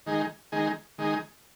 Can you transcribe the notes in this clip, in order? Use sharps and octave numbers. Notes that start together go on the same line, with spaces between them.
D#3 G#3 D#4 G#4
D#3 G#3 D#4 G#4
D#3 G#3 D#4 G#4